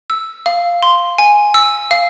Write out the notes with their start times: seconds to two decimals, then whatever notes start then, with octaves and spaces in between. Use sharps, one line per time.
0.10 E6
0.46 F5
0.83 C6
1.18 G#5
1.54 E6
1.91 F5